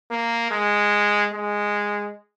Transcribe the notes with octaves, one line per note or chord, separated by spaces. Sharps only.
A#3
G#3
G#3